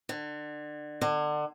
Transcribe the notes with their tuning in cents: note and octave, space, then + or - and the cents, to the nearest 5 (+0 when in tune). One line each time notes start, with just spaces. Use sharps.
D3 +30
D3 +30